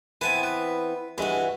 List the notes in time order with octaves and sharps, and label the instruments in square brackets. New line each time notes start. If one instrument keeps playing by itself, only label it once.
[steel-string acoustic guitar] E3 B3 C4 [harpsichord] B4 G#5 A5
[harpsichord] B4
[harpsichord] G2 G#3 [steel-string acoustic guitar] E3 F#4